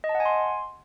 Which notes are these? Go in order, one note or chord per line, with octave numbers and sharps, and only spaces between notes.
D#5
A5
F#5
G#5
C6